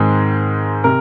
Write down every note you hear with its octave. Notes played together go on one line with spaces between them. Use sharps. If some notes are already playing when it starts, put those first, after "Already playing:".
Already playing: G#2 D#3 G#3 C4
C3 A#4